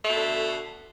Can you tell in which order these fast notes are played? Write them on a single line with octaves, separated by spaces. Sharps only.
A3 B2 D3